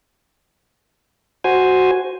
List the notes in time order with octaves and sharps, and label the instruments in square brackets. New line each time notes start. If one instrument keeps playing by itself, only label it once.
[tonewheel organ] F#4 C5 G#5